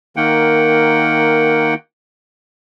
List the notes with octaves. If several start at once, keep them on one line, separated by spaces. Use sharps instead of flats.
D#3 A#3 F#5 G5